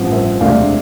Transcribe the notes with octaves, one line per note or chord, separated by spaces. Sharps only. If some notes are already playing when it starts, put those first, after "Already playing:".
Already playing: A1 G2 F3 C4
C5 E5
E1 D2 C3 D5 F5